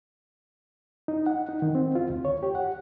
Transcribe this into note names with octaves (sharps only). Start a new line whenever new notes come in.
D#4
F#5
D#4
D#3
C4
F4
D2
C#5
G4
F#5